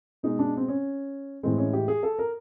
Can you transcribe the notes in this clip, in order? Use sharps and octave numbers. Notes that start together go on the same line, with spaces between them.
B2 G#3 D#4
D4
C4
C#4
A2 E3 G#3 C4
C#4
G4
G#4
A4
A#4